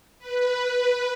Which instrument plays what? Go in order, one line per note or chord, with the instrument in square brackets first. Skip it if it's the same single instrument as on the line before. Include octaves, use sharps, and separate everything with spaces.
[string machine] B4